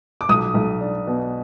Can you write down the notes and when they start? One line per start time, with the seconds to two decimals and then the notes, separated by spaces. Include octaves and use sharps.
0.21 D6
0.29 B1 D#6
0.54 B1
0.81 D4
1.07 B2